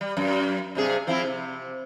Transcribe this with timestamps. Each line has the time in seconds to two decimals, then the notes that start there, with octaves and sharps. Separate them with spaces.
0.01 G3
0.17 F#2
0.75 G2 C3 G#4
1.07 F3 C4 E4
1.23 C3